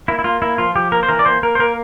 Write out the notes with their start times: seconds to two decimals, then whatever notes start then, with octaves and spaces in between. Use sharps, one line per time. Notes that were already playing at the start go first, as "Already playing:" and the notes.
0.08 A#3 E4
0.19 E4
0.24 A#3 F4
0.42 A#3 E4
0.58 F3 F4
0.75 F3 G4
0.92 A#3 A#4
1.03 C5
1.09 E3 A#4
1.19 D5
1.26 A#3 C5
1.43 A#3 A#4
1.55 C5
1.59 A#3 A#4